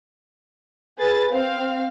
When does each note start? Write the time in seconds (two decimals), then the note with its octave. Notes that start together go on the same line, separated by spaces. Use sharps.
0.98 G#4 B4 A6
1.31 C4 F5